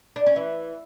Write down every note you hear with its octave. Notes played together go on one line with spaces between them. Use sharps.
D4
C#4
E3